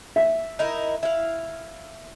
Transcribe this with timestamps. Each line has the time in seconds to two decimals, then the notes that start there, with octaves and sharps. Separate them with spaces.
0.16 E5
0.59 D#4 E4 A#4
1.03 E4 F5